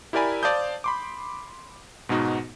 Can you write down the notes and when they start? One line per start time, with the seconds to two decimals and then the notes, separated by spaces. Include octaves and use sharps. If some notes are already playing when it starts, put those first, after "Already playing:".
0.13 E4 G4 A#4 D5 G#5 B5
0.43 C5 D5 F5 A5 D#6 G6
0.84 B5 C6 D6
2.09 G#2 B2 B3 D#4 F#4